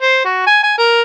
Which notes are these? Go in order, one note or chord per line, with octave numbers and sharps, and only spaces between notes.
C5
F#4
G#5
G#5
A#4